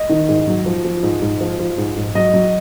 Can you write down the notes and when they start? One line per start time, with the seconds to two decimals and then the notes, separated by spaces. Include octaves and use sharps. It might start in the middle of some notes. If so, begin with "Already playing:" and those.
Already playing: D#5
0.09 D#3
0.29 G#2
0.47 F#3
0.66 F3
0.84 F3
1.03 G#2
1.22 G#2
1.41 F3
1.59 F3
1.78 G#2
1.96 G#2
2.15 F#3 D#5
2.33 F#3